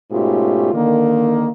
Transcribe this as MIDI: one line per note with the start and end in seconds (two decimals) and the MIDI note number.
0.12 0.73 44
0.12 0.73 47
0.12 0.73 57
0.12 0.73 61
0.12 0.73 65
0.12 0.73 67
0.74 1.48 50
0.74 1.48 51
0.74 1.48 58